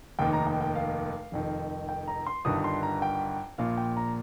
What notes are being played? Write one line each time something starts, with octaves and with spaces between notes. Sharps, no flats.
F1 D#2 D#3 G5
A#5
G5
G5
F5
F1 F2 D#3
G5
A#5
C6
G1 G2 D#3 D#6
C6
A#5
G5
A#1 A#2 F5
G5
A#5